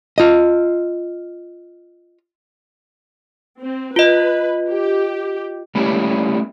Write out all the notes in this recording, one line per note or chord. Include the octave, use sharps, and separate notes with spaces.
F4 D#5
C4
F4 B4 D#5
G4
G3 A3 A#3 C#4 E4 G4